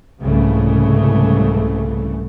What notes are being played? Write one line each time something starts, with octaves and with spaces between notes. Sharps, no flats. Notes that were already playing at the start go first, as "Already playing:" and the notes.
C2 G#2 C#3 E3 A3